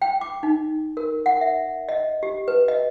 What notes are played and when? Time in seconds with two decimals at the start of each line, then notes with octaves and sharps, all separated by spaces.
0.02 G5
0.21 D6
0.43 D#4
0.97 A#4
1.26 F#5
1.41 E5
1.89 D#5
2.23 G4
2.48 B4
2.68 D#5